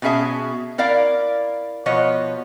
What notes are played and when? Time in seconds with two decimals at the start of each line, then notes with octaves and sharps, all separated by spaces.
0.02 B2 B3 C#4 G#4 E5 A5
0.78 E4 A#4 D5 F5
1.86 B2 F3 B3 C#5 D#5